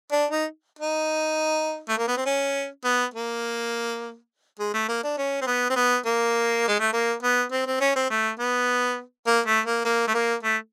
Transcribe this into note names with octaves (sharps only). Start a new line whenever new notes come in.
D4
D#4
D#4
A3
A#3
B3
C4
C#4
B3
A#3
G#3
A3
A#3
D4
C#4
C4
B3
C4
B3
A#3
G#3
A3
A#3
B3
C4
C4
C#4
C4
A3
B3
A#3
A3
A#3
A#3
A3
A#3
A3